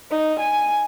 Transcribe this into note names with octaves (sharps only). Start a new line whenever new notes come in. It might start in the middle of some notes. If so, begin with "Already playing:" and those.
D#4
G#5